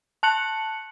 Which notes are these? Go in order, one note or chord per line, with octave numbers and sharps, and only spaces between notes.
A5 F#6 C#7 F#7